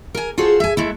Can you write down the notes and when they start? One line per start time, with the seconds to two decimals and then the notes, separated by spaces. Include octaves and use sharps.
0.15 A#4 G#5
0.38 F4 F#4 G#4 A4 C5
0.60 E5 G#5
0.77 G#3 A3 E4